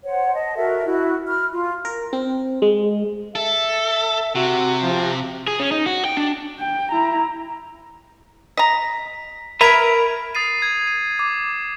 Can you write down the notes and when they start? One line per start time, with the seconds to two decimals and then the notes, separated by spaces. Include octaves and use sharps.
0.04 C5 C#5 F#5
0.34 D#5 A5
0.56 F#4 A4 A#4 E5
0.85 E4 F#4
1.28 B5 F6
1.52 F4
1.85 A#4
2.13 C4
2.62 G#3
3.35 A4 E5
4.35 C3 F#4
4.82 F3
5.48 G#4
5.60 C#4
5.71 D#4
5.86 F#4
6.05 G5
6.17 D4
6.60 G5
6.92 E4 A#5
8.57 D#5 A#5 B6
9.61 A#4 B4 E5 A#5 B5 G#6 D7
10.35 D#6 A6 C7 D#7
10.62 G#6
10.87 D#7
11.19 D6